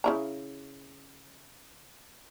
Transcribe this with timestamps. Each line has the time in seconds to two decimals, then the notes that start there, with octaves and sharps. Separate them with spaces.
0.04 C#3 E4 A#5